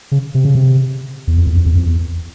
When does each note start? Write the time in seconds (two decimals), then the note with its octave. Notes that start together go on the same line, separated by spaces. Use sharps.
0.12 C#3
0.34 C3
0.45 C#3
0.55 C3
1.27 E2
1.37 F2
1.47 E2
1.56 F2
1.66 E2
1.76 F2
1.86 E2